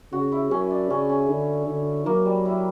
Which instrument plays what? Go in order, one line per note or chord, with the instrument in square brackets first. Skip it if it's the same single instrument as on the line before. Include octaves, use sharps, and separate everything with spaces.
[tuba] C#3 [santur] F#4
[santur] E4
[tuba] F#2 [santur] C#4
[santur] D4
[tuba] C#3 [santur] C#4
[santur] C#4
[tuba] D3
D3
[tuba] F#3 [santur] A#3
[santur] G3
E4